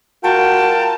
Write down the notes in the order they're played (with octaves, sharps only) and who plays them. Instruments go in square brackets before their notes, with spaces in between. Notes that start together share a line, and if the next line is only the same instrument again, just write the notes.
[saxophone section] G#3 F4 A#4 [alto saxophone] F#4 [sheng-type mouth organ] G5 [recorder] A5